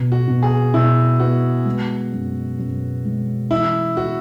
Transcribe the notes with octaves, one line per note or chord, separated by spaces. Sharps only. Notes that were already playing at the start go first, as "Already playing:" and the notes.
Already playing: B2
F#4
B2
G#4
B2 E4
B3 F#4
G#3
F#2
F#2
G#3
E3 E4
E4 F#4